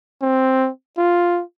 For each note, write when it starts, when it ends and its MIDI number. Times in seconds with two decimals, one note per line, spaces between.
0.22 0.69 60
0.98 1.42 65